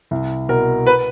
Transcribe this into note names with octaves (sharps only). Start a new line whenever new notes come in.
C2
B2 A#4
B4